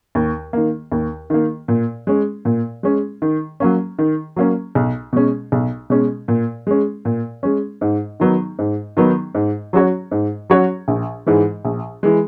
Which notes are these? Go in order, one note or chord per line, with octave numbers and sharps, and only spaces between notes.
D#2
D#3 A#3
D#2
D#3 A#3
A#2
G#3 C#4
A#2
G#3 C#4
D#3
F#3 A#3 C#4
D#3
F#3 A#3 C#4
B1
B2 G#3 C#4
B1
B2 G#3 C#4
A#2
G#3 C#4
A#2
G#3 C#4
G#2
D#3 F#3 B3 D#4
G#2
D#3 F#3 B3 D#4
G#2
F#3 C#4 F#4 C#5
G#2
F#3 C#4 F#4 C#5
A#1
G#2 E3 G#3
A#1
E3 G#3